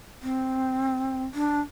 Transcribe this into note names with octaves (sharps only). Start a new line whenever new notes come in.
C4
D4